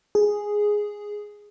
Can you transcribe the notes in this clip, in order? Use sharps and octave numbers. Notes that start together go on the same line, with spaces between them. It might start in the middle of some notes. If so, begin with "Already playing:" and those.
G#4